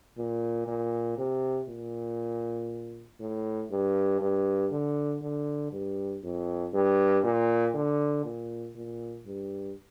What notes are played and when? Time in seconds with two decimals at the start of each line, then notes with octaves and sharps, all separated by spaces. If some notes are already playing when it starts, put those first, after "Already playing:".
0.17 A#2
0.67 A#2
1.18 C3
1.69 A#2
3.20 A2
3.71 G2
4.21 G2
4.71 D3
5.22 D3
5.72 G2
6.23 F2
6.74 G2
7.24 A#2
7.74 D3
8.25 A#2
8.75 A#2
9.26 G2